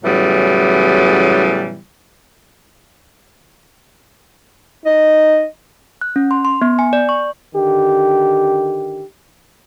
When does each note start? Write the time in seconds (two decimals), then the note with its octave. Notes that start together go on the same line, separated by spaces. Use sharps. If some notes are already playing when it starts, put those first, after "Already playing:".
0.04 A2 C#3 E3 F#3 G3 B3
4.86 D#4 D#5
6.01 F#6
6.16 C#4
6.31 C6
6.45 C6
6.62 B3
6.79 G#5
6.93 D5
7.09 C#6
7.55 D3 D#3 G4